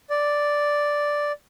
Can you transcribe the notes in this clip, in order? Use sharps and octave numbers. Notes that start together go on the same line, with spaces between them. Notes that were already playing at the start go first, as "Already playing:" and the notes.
D5